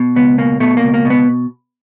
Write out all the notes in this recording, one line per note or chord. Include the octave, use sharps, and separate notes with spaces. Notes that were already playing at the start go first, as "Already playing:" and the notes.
Already playing: B2
C#2 B3
B2 A#3
B2 A3
A#3
C#2
A#3
B2
B3